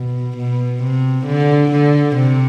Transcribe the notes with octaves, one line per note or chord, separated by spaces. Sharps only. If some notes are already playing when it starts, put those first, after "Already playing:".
Already playing: B2
B2
C3
D3
D3
C3